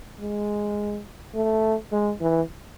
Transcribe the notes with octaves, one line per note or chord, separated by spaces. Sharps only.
G#3
A3
G#3
E3